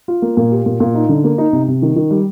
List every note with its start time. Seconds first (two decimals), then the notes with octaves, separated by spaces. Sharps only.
0.08 F4
0.22 A#3
0.37 A#2
0.51 G4
0.66 A#2
0.80 A#2
0.94 D#4
1.09 D3
1.24 A#3
1.38 D#4
1.53 C3
1.68 C3
1.82 D#3
1.96 D#3
2.11 G3